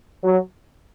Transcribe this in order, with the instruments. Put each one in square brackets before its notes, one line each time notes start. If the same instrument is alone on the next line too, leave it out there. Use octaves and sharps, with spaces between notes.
[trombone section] F#3